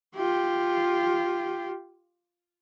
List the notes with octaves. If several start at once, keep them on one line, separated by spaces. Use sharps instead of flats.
F4 G4